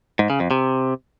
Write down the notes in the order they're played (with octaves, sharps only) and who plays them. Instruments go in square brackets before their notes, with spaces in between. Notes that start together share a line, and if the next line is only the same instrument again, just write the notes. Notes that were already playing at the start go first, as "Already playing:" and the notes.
[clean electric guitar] G#2
C#3
F2
C3